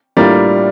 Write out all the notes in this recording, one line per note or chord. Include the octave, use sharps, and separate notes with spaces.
A2 G3 A#3 D4 F4 A#4 D5